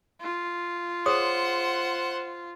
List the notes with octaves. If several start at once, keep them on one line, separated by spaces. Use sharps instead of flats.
F4
G#4 C5 C#5 F#5 D#6